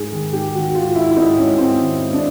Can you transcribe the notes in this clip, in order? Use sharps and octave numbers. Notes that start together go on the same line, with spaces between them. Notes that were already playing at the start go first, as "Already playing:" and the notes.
Already playing: G#2 G#4
D#3
G#2 G4
D#3 F#4
G#2 F4
G#2 E4
G#2 D#4
G#2 C#4
G#2 C4
D#3
G#2
D4